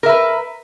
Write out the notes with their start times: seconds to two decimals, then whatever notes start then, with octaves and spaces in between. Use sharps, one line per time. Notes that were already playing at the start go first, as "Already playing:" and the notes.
0.03 A#4
0.06 E5
0.09 B4